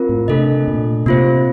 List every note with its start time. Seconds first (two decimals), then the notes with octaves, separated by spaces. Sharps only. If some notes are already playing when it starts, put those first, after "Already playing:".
Already playing: C4 F4 A#4
0.09 A2
0.28 C3 A3 D4 A4 D#5
0.68 A#2
1.06 C3 A#3 F4 C5